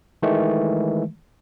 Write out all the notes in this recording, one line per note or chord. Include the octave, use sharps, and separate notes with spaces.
D#3 E3 G#3 A3